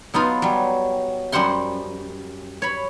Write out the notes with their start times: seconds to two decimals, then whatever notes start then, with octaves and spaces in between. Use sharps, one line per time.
0.14 F#3 B3 D#4 F4
0.42 F#3 G3
1.32 F#2 G3 C5 F#5 C6
2.62 C#5 B5